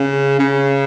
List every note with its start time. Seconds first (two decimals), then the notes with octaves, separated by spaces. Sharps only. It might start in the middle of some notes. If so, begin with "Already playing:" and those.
Already playing: C#3
0.39 C#3